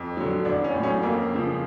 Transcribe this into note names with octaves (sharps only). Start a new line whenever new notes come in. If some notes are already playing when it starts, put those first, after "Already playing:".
Already playing: F2
D3 F#3
A1 D4
C#4
A2 F#3
C#4
F2 A#3
C#3 F3